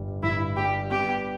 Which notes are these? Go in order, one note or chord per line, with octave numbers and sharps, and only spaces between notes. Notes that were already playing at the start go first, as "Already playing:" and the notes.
Already playing: G1 G3
G1 E4
G3 G4
B3 G4